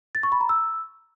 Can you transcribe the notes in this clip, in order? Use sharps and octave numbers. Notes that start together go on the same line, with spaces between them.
A6
C#6
B5
A#5
E6